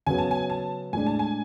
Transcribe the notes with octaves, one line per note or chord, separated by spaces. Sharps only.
C#3 F#3 B3 G#5
A5
G#5
A5
A2 G#3 D4 G#5
A5
G#5